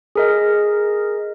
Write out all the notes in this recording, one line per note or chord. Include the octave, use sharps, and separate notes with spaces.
G#4 A#4 D#5